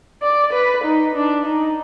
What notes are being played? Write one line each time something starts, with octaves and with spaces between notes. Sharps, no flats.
D5
B4
D#4
D4
D#4